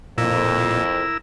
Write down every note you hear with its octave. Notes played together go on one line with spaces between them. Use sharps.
F2 A#2 E4 A#4 E6